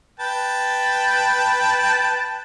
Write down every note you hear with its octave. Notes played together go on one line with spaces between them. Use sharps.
B4 G5 A5